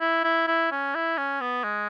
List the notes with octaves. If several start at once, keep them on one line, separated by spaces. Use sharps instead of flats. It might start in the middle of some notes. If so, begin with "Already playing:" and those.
E4
E4
E4
C#4
E4
C#4
B3
G#3